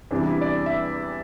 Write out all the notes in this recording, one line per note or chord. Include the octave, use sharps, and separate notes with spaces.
E2 C3 E3 G3 D4
E4
D5
E5